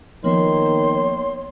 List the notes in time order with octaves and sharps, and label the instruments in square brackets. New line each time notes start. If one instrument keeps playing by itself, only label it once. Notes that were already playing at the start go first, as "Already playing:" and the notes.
[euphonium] D#3 [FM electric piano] F3 A#3 B3 [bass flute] C#5 [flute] C6